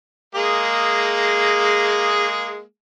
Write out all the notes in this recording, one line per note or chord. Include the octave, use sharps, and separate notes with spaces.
G#3 A#3 G#4